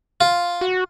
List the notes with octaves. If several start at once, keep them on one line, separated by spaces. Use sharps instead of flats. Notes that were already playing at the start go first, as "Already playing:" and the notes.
F4
F#4